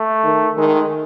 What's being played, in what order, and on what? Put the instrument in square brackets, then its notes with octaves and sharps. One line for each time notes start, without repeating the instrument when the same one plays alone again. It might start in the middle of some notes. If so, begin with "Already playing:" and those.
Already playing: [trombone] A3
[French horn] D#3
[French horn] D#3 [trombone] G#3